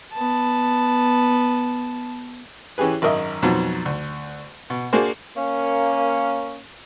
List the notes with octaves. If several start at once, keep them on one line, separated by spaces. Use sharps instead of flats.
B3 A5
E3 C#4 G4 G#4 B4
G#1 F#2 A#4 D#5 E5
F2 G#2 B2 F3 F#3
D2
B2
A#3 D4 F#4 G#4 A#4 C5
A#3 C#4